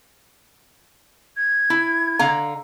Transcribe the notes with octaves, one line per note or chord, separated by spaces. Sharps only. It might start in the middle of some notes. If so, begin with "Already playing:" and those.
G#6
E4
D3 F5 A#5